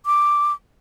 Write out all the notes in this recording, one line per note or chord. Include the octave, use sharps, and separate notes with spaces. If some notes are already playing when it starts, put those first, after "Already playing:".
D6